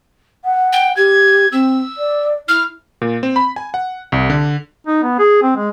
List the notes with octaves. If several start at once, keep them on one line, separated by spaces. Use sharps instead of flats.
F#5
G5
G4 G#6
C4 E6
D5
E4 F6
A#2
C4
B5
G#5
F#5
C2
D3
D#4
B3
G#4
C4
G#3